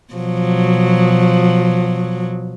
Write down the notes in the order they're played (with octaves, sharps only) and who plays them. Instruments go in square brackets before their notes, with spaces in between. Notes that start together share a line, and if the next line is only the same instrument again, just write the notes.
[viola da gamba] B2 F3 F#3